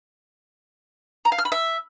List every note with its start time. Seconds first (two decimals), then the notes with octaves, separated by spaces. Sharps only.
1.25 A#5
1.32 F5
1.38 F6
1.45 B5
1.52 E5